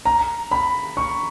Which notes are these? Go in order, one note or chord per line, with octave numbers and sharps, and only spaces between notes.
A#5
B5
C#6